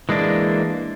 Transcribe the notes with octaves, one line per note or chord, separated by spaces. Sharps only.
E3 G#3 A#3 D4